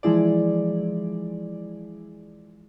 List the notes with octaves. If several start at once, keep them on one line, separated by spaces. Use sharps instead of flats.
E3 F3 G#3 E4 G#4 D5